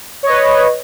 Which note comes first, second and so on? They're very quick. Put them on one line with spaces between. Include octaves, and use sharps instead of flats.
C#5 D#5 B4